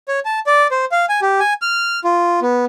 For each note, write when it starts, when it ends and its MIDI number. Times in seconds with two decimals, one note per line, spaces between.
0.08 0.20 73
0.25 0.39 81
0.47 0.67 74
0.71 0.85 72
0.92 1.06 77
1.09 1.20 80
1.22 1.40 67
1.40 1.53 80
1.62 2.00 89
2.04 2.40 65
2.42 2.65 59